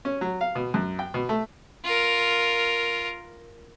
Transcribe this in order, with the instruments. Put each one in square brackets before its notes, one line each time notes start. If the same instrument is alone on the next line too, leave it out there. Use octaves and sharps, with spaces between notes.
[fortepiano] C#4
F#3
F5
B2
F#2
G5
B2
A3
[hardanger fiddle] F4 A#4